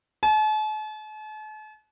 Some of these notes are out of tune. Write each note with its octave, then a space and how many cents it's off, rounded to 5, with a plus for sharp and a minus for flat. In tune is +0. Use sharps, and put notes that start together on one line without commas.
A5 -45